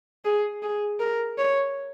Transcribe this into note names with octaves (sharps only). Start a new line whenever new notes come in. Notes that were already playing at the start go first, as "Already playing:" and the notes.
G#4
G#4
A#4
C#5